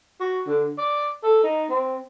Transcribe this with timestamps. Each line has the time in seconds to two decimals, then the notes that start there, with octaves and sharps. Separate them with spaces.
0.20 F#4
0.47 D3
0.78 D5
1.23 A4
1.43 D#4
1.69 C4